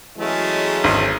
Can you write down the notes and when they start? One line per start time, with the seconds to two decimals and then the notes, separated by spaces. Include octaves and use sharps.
0.18 E3 F#3 G#3 A3 C#4
0.84 G#1